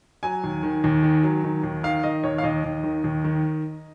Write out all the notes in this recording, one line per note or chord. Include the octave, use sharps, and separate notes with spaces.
F#3 G#5
D#2
D#3
D#2
D#3
F#3
D#3
D#2
D#3 F5
D#3 D#5
D#2 C#5
F5
D#2 D#5
D#2
D#3
D#2
D#3